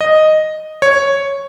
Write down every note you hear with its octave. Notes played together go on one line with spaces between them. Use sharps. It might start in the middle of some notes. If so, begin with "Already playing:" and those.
D#5
C#5